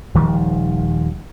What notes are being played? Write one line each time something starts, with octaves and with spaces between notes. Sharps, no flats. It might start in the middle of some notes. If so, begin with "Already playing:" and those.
D#1 D#3 F3 G3